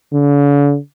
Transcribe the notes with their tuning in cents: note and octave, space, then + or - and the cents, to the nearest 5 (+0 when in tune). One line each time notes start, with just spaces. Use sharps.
D3 -45